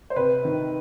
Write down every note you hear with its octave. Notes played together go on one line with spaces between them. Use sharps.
C5
C3 B4
D#3